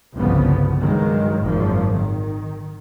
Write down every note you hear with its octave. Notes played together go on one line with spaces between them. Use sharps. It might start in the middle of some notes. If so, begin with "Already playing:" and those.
G1 C2 C#3 F3 B3
G2 D#3 F#3 G#3
G#1 F#2 A#2 F3
D#3